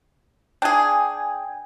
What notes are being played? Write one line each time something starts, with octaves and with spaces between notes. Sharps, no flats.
D4 G#4 G5 G#5